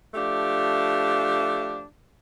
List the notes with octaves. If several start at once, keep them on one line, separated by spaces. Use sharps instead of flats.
F3 A3 D4 G4